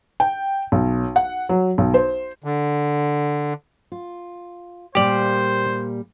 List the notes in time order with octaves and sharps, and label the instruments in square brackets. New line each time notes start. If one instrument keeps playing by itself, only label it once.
[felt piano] G5
B1
F#5
F#3
B1
C5
[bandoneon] D3
[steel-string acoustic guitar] F4
[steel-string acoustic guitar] A#2 G3 A#3 [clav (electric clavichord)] G4 D5 [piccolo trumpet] C5